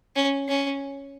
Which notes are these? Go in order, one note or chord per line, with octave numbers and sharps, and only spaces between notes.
C#4
C#4